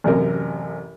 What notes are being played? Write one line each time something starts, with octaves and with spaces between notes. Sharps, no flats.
A1 F#2 C3 A#4